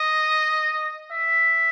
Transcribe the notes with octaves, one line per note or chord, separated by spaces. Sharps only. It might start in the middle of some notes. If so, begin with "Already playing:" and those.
Already playing: D#5
E5